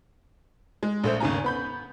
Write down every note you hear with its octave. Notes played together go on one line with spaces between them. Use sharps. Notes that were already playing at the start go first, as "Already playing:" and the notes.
G#3
A#1 A3 C5
G#1 D#2 C#3 G#5 A#5
B3 B5 G6